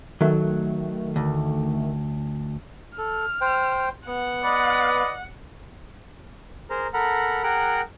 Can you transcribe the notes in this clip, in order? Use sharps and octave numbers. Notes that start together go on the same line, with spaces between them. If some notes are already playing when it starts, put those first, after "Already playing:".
D#3 F#3 A3
D2
A4 F6
C5 G5
B3 F#5
B4 D5 D#5
G#4 A#4 C5 A#5
A4 A#4 F#5 A#5 B5
G#4 A#4 F#5 G5 A#5 F#6